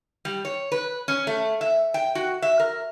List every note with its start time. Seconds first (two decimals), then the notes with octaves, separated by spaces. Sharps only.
0.25 G3
0.45 C#5
0.72 B4
1.08 C#4
1.27 A3
1.61 E5
1.94 G5
2.15 F#4
2.42 E5
2.60 A#4